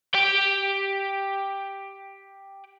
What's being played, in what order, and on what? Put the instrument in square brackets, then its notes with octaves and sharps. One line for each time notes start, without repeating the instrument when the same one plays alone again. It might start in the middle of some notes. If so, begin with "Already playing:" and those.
[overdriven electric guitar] G4 G5